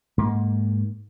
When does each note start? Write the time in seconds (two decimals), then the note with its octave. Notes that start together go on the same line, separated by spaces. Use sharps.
0.18 G#2 A#3